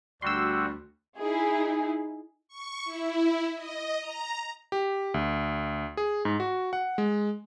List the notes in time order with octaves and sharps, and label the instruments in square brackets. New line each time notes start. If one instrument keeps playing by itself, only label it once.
[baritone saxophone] D2 [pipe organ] G3 F#4 [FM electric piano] C6 E6
[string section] D#4 E4 G#4
[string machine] C#6
E4
D#5
A#5
[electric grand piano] G4
D2
G#4
G#2
F#4
F#5
G#3